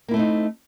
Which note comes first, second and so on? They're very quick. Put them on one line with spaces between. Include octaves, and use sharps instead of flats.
A#3 E4 A3 C4 D#4